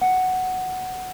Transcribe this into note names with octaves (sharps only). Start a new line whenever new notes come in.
F#5